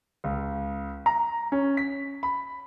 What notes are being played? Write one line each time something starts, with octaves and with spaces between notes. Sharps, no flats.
C#2
A#5
C#4
B6
B5